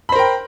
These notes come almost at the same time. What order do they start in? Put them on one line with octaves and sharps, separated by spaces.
B5 C5 A#4 G5